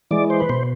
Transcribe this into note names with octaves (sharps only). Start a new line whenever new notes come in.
E3 G#3 D5
C5
B4
B2 C5